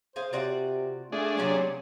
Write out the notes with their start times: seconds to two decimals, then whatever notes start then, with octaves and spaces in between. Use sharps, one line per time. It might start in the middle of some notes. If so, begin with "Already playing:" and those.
0.16 G#4 C5 F5
0.33 C3 F4 F#4 D5
1.12 A3 D4 G#4
1.37 C3 F#3 A#3 C#4